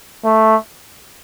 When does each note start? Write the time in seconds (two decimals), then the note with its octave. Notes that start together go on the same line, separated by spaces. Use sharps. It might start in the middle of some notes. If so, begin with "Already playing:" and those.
0.24 A3